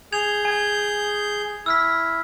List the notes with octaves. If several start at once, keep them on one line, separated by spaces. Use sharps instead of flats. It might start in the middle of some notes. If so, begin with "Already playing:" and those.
G#4 G6 G#6 F7
G#5 G#6
E4 E6 F6 B6